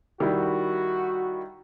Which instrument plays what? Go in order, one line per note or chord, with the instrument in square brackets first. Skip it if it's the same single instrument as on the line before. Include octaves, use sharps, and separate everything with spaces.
[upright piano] D#3 G3 E4 [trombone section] F#4